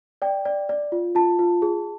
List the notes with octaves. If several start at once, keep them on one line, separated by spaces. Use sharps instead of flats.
D5 G5
D5
D5
F4
F4 A5
F4
G#4